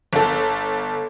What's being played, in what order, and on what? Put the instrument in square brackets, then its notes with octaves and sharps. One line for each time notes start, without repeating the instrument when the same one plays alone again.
[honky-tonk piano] G1 A4